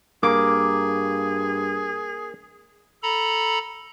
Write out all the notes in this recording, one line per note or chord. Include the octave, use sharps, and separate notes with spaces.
G2 A#3 G#4 D6
A4 A#5 B5